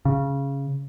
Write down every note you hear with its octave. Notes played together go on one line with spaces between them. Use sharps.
C#3